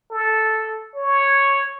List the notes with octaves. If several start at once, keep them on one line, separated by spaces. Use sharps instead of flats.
A4
C#5